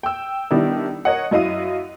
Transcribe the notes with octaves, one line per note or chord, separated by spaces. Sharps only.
G5 E6
D#3 G3 B3 D4 E4
A#4 C#5 D#5 F#5
F#2 E4 D#5 F5 D#7